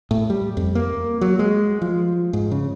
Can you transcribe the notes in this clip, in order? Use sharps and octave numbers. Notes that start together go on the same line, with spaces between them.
A2
G3
F2
A#3
F#3
G#3
F3
G#2
C#3